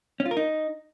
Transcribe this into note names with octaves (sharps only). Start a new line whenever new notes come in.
C#4
F4
A#4
D#4